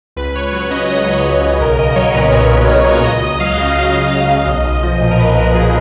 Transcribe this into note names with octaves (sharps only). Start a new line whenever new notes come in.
C#2 B4
C#2 C#5
F#3
C#3 D#5
C#2 D#5
C#2
C#5
F#3 D#5
C#3
B1 A#4
B1 D#5
F#3 C#5
A#2 B4
B1 C#5
B1
F#3 C#5
A#2
C#2 D#5
C#2
F#3 F5
C#3
C#2 D#5
C#2
F#3
C#3
B1
B1
F3
A#2
A#4
B1 B4
B1 A#4
F3 G#4